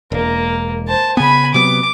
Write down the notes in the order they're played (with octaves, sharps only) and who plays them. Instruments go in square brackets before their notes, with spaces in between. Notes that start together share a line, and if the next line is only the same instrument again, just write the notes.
[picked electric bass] E1 [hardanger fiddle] A#3
[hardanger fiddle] C5 A5
[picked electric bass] C#3 B3 [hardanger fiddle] G#5 B5
[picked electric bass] C3 F#3 B3 [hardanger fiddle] D6